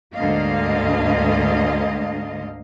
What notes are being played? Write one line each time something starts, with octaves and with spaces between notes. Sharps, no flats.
D2 G#2 D3 A#3 D#5 F5